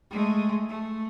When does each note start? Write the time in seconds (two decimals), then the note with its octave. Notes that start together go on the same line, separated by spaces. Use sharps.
0.11 G#3 A3
0.69 A3